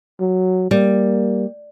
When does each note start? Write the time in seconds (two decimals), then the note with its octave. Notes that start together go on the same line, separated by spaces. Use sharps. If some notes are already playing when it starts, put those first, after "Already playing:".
0.20 F#3
0.71 G3 A#3